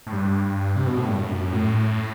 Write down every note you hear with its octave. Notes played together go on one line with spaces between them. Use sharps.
A2
G2
C3
B2
A2
G2
F#2
A2